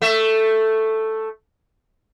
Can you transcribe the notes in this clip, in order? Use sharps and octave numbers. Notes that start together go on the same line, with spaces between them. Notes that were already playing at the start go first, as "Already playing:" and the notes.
A3 E5